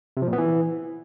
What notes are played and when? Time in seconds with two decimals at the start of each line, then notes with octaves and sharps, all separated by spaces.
0.17 C3
0.22 F3
0.27 A#2
0.33 B3
0.38 E3